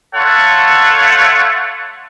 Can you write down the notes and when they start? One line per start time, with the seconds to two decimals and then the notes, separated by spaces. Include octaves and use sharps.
0.15 A3 F4 A4 C#5 F#5